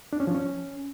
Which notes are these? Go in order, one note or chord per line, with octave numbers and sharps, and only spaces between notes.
D4
C#4
F3
C#4